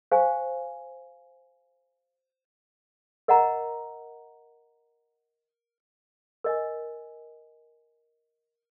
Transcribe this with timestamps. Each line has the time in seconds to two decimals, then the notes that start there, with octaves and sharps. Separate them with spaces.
0.12 G4 C5 F5 G#5
3.28 A#4 D#5 F#5 A#5
6.44 A#4 D#5 G#5